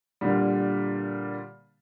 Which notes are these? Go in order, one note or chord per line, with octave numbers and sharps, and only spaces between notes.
A#2 D3 G3